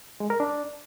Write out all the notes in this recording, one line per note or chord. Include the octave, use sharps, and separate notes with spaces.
G#3
A#4
D4